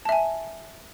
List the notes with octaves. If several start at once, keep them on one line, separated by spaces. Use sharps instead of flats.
E5 G#5 A5